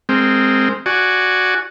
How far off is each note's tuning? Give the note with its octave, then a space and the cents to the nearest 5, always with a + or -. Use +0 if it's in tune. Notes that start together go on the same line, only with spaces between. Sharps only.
G#3 +0 C4 +0 A#4 -25
F#4 +0 D5 +0 G#5 +0